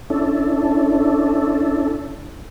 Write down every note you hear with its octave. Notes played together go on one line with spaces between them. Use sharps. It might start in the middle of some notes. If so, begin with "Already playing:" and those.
C#4 D4 E4 A4